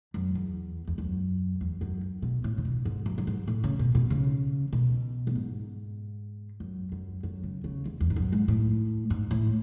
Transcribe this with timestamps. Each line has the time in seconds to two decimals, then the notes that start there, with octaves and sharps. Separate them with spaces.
0.14 F#2
0.35 E2
0.88 E2
0.98 F#2
1.61 E2
1.81 F#2
2.22 B2
2.44 A2
2.58 C#3
2.65 B2
2.85 G#2
3.06 F#2
3.18 F#2
3.27 G#2
3.48 A2
3.64 C#3
3.79 B2
3.95 B2
4.10 C#3
4.73 B2
5.27 F#2
5.35 G#2
6.60 F#2
6.92 F#2
7.23 F#2
7.43 C#3
7.64 C#3
7.86 E2
8.01 E2
8.10 G#2
8.16 F#2
8.32 G#2
8.48 A2
9.10 G#2
9.31 A2